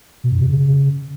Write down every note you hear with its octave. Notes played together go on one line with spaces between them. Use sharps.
B2
F#2
C3
C#3